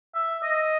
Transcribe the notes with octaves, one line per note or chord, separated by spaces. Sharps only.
E5
D#5